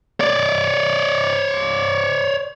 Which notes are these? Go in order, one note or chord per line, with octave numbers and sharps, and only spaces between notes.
C#5 D5